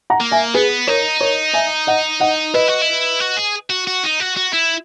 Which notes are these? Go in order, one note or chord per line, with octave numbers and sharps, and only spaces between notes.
F#5 A#5
A#3
E5 G#5
B3 G#4 B4
D#4 A#4 C#5
A#4 C#5
E5 G#5
D#5 F#5
D#5 F#5
E4 B4 D#5
F#4
E4
F#4
G#4
F#4
F#4
D#4
F#4
F#4
E4